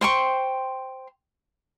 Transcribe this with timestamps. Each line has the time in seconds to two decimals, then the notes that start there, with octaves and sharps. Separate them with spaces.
0.01 C5 G5 C6 C#6